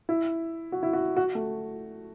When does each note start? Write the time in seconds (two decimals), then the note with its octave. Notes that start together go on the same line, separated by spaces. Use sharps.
0.09 E4
0.72 F#4
0.83 E4
0.93 F#4
1.17 F#4
1.35 A3